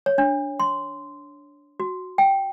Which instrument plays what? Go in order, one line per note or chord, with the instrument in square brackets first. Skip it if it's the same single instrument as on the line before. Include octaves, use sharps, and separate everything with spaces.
[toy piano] C#5
D4
C6
F#4
G5